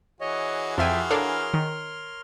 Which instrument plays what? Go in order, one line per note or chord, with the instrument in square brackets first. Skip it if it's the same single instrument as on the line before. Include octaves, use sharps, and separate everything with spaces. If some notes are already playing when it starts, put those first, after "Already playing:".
[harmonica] E3 F#4 G#4 [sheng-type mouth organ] C#5 D#5
[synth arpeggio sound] F2 G#5 [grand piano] F3 E5 G5 [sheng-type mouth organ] C6 F6
[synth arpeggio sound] D4 A4 F5 [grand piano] A#4 C#5
[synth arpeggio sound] D#3